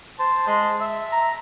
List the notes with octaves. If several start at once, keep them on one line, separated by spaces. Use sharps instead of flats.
C5 A5
G#3
E5
A#5